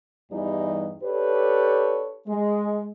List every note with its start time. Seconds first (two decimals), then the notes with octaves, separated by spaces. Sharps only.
0.31 E2 G2 E3 G3 D#4
1.03 D4 G4 A4 B4 C#5
2.27 G#3